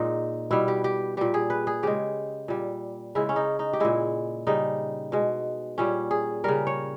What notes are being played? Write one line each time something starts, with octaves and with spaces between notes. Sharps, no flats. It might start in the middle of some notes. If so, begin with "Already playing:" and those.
Already playing: A#2 G#3 D#4
B2 G3 E4
G4
G4
A#2 G3 G4
G#4
B4
G#4
C#3 G#3 G4
A#2 G3
C#3 G#3 E4
C#4
D#4
D#4
G4
A#2 G#3 E4
C#3 G3 D#4
B2 G#3
A#2 G3 C#4
G#4
C#3 G3 A#4
C#5